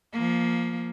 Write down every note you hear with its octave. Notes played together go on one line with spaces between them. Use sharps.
F3 A#3